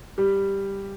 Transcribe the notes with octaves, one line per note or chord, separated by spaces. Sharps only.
G3 G4